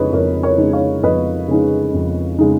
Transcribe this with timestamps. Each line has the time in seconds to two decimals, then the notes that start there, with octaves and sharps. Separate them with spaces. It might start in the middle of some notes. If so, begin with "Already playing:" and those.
Already playing: F2 C#3 G#3 D#4 B4 C#5 D#5
0.13 F2 A#4 C#5
0.43 A#4 C#5
0.58 C#3 G#3 D#4
0.73 C#5 F5
1.03 F2 B4 D#5
1.48 C#3 G#3 D#4
1.94 F2
2.39 C#3 G#3 D#4